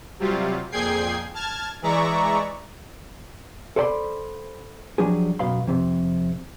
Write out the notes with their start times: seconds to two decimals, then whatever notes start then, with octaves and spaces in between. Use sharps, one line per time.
0.19 C3 F#3 G3 F4
0.71 F2 A#2 G#4 G5 G#6 C7
1.34 A5 F6 G#6
1.82 E3 G#3 D5 E5 A#5 C#6
3.76 A4 C5 D5 G#5 B5 C6
4.98 F3 F#3 D4 G4 G#4
5.39 F#2 B2 F5 B5 C6
5.67 F2 C3